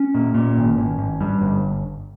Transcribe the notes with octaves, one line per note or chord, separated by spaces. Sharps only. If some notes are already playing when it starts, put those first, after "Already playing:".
Already playing: C#4
A#2
A#2
G#1
G#1
G#1
G2
G1